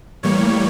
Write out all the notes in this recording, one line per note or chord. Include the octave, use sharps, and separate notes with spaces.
A2 E3 G3 A#3 C#5